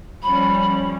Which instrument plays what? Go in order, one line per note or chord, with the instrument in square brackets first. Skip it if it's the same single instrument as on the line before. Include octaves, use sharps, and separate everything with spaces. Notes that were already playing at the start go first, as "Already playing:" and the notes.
[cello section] F3 G3 C#4 [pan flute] B5